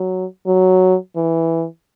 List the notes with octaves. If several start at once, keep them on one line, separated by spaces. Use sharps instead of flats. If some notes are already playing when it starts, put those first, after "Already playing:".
Already playing: F#3
F#3
E3